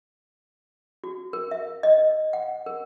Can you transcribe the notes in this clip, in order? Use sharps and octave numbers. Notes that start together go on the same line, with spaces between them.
F#4
A#4
E5
D#5
F#5
A#4